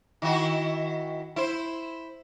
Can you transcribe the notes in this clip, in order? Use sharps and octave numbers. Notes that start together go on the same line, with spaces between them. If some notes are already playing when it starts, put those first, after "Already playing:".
D#3 E4 F#4
E4 C5